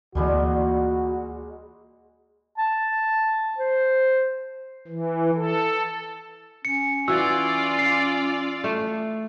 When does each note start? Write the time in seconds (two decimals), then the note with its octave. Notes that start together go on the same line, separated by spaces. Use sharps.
0.15 D2 A#2 E3 G3 G#3 F#4
2.58 A5
3.58 C5
4.88 E3
5.35 A4
6.65 C#4 C#7
7.08 E3 F4 F#4 D5 E6
7.79 C7
8.64 A3